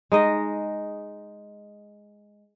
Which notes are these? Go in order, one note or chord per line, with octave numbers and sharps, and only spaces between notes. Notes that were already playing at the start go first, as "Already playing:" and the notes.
G#3 D#4 D#5